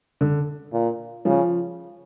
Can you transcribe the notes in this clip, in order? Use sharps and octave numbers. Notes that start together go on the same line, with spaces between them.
D3
A#2
C#3 F3